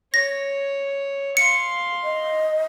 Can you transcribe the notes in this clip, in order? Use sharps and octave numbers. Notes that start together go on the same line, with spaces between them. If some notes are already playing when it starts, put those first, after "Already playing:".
C#5 A#6
F5 C6 C#7
D#5